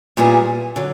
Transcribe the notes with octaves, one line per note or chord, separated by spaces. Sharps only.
A#2 G3 B3 E4 G#4
D3 F#3